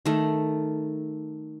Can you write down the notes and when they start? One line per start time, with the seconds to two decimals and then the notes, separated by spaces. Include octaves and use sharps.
0.05 D#3 A3